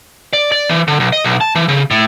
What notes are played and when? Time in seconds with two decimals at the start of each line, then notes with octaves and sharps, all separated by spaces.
0.33 D5
0.52 D5
0.69 E3
0.88 D3
1.00 B1
1.13 D#5
1.25 B1
1.41 A5
1.55 E3
1.68 C#3
1.91 A2